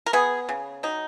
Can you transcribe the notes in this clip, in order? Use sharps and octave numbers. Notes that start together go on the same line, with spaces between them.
A#4
B3 G#4
C#3
F#3 D#4